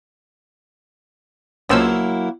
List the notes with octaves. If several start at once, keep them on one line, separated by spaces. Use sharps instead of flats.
C#2 F3 F#3 A#3 E4 E6